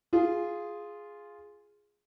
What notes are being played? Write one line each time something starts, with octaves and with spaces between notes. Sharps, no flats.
F4 G#4